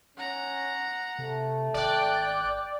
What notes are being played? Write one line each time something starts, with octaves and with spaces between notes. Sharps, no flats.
C#4 F#5 A#5
C3 A3
G#1 D5 G5 F#6